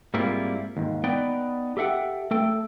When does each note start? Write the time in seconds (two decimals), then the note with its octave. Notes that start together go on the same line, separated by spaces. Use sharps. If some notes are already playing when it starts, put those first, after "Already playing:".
0.14 G#2 G3 A#3 C4 E4 F4
0.77 D#2 G#2
1.04 B3 D#4 B4 D5 G5
1.77 G4 A4 E5 F#5 G5
2.31 A3 A4 G5